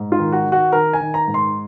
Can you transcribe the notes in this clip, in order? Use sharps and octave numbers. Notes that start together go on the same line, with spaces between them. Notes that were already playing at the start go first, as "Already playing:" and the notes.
Already playing: G#2
F4
D#3
F#4
D#3
F#4
D#3 A#4
G#5
D#3
A#5
G#2
C6